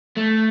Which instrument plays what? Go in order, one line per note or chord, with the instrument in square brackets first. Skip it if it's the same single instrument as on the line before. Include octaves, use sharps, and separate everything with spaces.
[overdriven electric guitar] A3